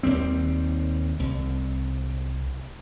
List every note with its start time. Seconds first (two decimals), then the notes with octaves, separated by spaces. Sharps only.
0.03 D#2 G3 C4
1.20 C2